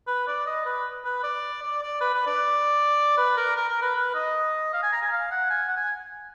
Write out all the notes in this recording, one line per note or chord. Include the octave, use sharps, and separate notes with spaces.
B4
D5
D#5
B4
B4
D5
D5
D5
B4
B4
D5
B4
A#4
A#4
A#4
B4
B4
D#5
F5
G#5
A#5
G#5
F5
F#5
G#5
F#5
G#5